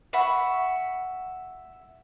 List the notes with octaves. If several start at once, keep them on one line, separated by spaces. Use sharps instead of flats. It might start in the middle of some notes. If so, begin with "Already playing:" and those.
E5 F#5 B5 C#6